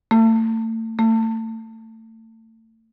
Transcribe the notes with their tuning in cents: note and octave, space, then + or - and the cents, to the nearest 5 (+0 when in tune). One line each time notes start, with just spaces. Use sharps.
A3 +35
A3 +30